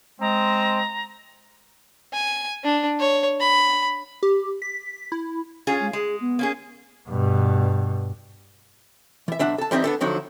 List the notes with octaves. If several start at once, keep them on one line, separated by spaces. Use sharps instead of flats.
G#3 C4 A#5
G#5
D4
C#5
B5
G4
B6
E4
C#4 F4 G#4
G#3
G#3 G#4
B3
A#3 C#4 G#4
G2 B2
E3 E5
B1 D4 E5 F#5
A4 A5
E3 G3 C4 D#4 E5
B3 D4 A4
D3 F3 F#3 D#4 E4